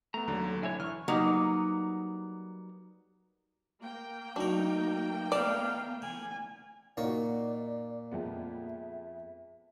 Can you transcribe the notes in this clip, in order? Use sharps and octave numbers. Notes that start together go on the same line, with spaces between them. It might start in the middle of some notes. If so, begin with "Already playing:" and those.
A3 B3 A#5
D#2 D3 F#3
D3 E4 C#5 E5 G#5
E3 C#6 F6
F#3 G3 A#3 B3 D#4
A#3 G5
F#3 D4 D#4 A#4
B3 D#4 D5 F5 A5 A#5
D3 G#5
A#2 A#3 D#4 F#4 C#5 D5
F2 G#3 B3 E5